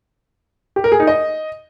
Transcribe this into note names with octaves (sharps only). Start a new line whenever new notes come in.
G4
A#4
G#4
D#4
D#5